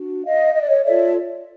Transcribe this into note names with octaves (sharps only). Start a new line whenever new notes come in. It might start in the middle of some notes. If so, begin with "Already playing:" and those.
Already playing: D4 F#4
D#5 F5
D#5
D5
C#5 D#5
F4 A4 C#5 D5 E5